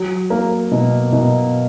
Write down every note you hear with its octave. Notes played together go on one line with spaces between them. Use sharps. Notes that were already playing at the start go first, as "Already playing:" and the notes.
Already playing: F#3
A#3
B2
B2